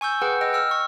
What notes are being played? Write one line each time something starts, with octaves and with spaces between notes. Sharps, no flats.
G#5 C#6 E6 G6
G#4 B4 F#5 G5
D#5 G5 E6
G5 E6 F6
C#6